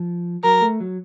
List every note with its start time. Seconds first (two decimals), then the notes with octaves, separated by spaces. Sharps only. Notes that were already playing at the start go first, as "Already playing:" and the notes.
Already playing: F3
0.43 F#3 A#4
0.61 A3
0.80 F#3